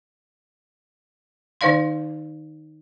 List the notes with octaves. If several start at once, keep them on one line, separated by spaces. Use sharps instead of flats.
D#3 D#4 D5 F5 C6